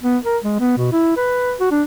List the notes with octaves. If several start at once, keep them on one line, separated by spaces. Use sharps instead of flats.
B3
A#4
G#3
B3
B2
E4
B4
F#4
D4